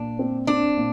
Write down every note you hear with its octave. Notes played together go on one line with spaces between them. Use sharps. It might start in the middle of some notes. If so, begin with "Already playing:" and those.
Already playing: A#2 D4
C4
C4 D4
A#2